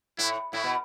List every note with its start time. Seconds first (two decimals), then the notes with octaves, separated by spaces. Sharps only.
0.18 A2 E4
0.53 A2 E4
0.64 B2